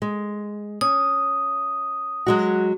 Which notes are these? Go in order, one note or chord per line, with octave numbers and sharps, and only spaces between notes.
G#3
C#4 D#6
F#3 G#3 F#4